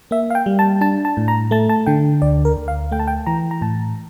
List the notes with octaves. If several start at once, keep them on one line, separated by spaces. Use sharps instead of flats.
A#3 E5
F5
G5
G3
A5
D4 A5
A5
A2
A#5
A3 A5
A5
D3 G5
D2 D5
A#4
D2
F5
A3 G5
A5
G5
E3 A#5
A#5
A2 A5